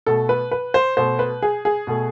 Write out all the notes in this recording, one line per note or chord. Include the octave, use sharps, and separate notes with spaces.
B2 A3 A4
B4
B4
C5
B2 A3 C5
B4
G#4
G#4
B2 A3